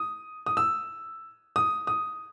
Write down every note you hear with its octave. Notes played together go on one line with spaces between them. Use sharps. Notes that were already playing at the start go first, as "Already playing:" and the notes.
Already playing: D#6
D#6
E6
D#6
D#6